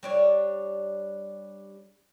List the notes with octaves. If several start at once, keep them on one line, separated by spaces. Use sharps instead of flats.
G3 D4 C#5